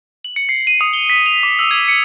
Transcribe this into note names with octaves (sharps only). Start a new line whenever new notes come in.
F#7
C#7
C7
D#7
D#6
G7
B6
F7
D6
E6
G#6
C#7